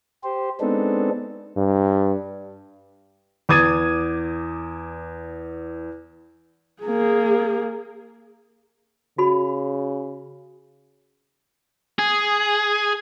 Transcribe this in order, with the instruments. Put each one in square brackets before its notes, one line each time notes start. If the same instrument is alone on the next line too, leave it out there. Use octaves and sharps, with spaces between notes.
[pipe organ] G4 C5
G#3 B3 C4 D4 D#4 A4
[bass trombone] G2
[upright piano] E2 D6 D#6 G#6 A6 D#7
[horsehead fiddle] A#3 G#4
[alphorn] C#3 [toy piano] F#4 B5
[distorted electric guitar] G#4